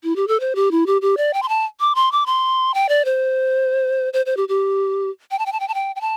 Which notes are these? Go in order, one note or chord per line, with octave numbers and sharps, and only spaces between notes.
E4
G4
A4
C5
G4
E4
G4
G4
D5
G5
C6
A5
D6
C6
D6
C6
G5
D5
C5
C5
C5
G4
G4
G5
A5
G5
A5
G5
A5
G5
G5
A5